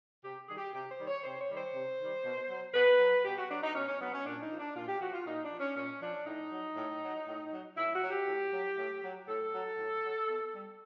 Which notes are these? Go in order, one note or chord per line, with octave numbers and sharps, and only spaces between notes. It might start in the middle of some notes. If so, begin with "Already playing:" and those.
C3 G4
D#3 G3 G#4
G4
C3 G4
C5
D#3 G3
C#5
C3 C5
C#5
D#3 G3
C5
C3
D#3 G3
B2
F#3
B2 B4
F#3
B2 G4
F#4
F#3 D4
D#4
B2 C#4
C#4
F#3 B3
C#4
A#2 D4
D#4
F3
D4
A#2 F4
G4
F3 F#4
F4
A#2 D#4
D4
F3
C#4
A#2 C#4
F3 D4
A2 D#4
F#3
A2
F#3
A2
F#3
A2 E4
F#4
F#3
G4
A2
F#3
A2
F#3
A2 A4
F#3
A2
F#3
B2
G3